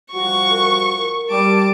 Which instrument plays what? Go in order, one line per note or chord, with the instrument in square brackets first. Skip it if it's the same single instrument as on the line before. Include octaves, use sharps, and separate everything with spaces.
[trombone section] F3 G3 F#4 [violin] C#6
[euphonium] A#4
[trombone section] G3 [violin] A5 D6